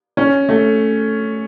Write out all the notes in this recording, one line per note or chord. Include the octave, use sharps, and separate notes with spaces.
C#4
A3